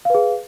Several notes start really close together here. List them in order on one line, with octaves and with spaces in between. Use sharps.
F5 B4 G#4